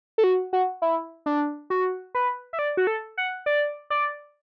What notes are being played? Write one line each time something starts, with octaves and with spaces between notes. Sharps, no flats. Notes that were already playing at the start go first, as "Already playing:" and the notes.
A4
F#4
F#4
E4
D4
F#4
B4
E5
D5
F#4
A4
F#5
D5
D5